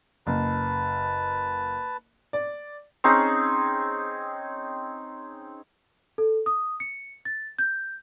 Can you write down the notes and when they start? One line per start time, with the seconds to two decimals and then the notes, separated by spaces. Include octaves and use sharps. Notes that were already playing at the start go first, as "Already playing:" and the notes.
0.27 F#1 B4 A5
2.33 D5
3.04 C4 C#4 D#4 G#4
6.18 A4
6.46 D#6
6.80 C#7
7.25 A6
7.59 G6